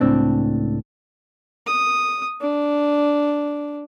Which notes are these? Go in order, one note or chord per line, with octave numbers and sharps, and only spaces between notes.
C#2 A2 C4 D4
D#6
D4